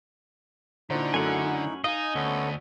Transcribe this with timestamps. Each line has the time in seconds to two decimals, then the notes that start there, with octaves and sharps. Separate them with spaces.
0.90 A#2 D3 D#4 E4 F#4 C5
1.14 F#2 A3 C#4 F#5 G#5
1.84 D#4 D#5 F5 G#5
2.15 D2 B3 C#4 A4